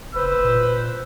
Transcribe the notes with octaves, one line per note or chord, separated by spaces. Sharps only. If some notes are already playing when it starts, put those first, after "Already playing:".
F#1 B4 C5 E6
A#2